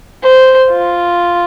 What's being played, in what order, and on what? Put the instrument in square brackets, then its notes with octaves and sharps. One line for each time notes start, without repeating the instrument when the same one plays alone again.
[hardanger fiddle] C5
F4